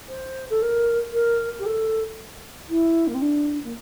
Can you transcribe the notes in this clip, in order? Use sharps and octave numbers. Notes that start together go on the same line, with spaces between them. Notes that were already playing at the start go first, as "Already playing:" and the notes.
C5
A4
A#4
A#4
G4
A4
E4
A#3
C4
D4
A#3